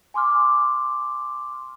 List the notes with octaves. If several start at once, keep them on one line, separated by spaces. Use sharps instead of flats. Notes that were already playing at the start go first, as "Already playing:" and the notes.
G#5 C6 D6 F6